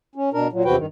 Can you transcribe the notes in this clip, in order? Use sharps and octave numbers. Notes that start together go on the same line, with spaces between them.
C#4
B2 D4 A#4
A#2 F#3
E2 C3 F3 F#4 B4 G5
G2 D#3